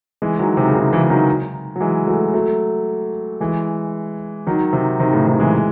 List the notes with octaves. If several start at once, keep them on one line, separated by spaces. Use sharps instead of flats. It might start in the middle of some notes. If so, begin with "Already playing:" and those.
E3 G#3
D#3 F#3
C3 D#3
C#3
C3 D#3
C#3 E3
E3
D#3 F#3
F#3
E3 G#3
F#3 A3
F#3 A3
E3 G#3
D#3 F#3
C3 D#3
C3 D#3
A2 C#3
C3 D#3
E3 G#3